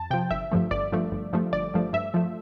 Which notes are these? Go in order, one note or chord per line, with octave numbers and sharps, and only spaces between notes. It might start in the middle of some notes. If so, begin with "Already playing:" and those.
Already playing: F2 A5
C3 F3 G5
G1 E5
G2 F3 A3
G1 D5
G2 F3 A3
G1
G2 F3 A3
G1 D5
G2 F3 A3
G2 E5
F3 A3